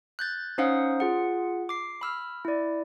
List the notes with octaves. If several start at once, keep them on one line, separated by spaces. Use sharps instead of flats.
F#6 G6 A6
C#4 D#4 C5 F5 F#5 D#6
F4 G#4 F#5
D6 C7
B5 E6 F6
E4 D5